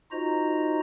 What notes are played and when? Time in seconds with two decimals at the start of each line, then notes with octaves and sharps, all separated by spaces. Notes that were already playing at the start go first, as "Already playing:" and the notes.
0.12 D#4 F4 F#4 C5 D#5 A#5